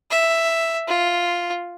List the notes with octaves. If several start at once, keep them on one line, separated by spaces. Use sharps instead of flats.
E5
F4